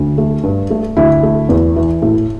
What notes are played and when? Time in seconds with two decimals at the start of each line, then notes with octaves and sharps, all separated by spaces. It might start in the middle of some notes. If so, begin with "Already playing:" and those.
Already playing: D2
0.18 A3
0.43 G2
0.70 A3
0.97 D2 E4
1.23 A3
1.49 E2
1.76 E3
2.02 A2